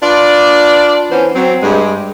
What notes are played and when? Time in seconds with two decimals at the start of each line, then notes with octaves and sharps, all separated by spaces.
0.03 D4 F4 B4 D5
1.11 E3 B3 C#4 C5
1.35 F#3 C4
1.62 G2 G#3